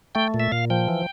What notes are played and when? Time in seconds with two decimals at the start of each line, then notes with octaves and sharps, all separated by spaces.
0.15 A3 G5
0.34 A#2
0.40 E5
0.52 A#2 F5
0.70 F3 G5
0.88 E3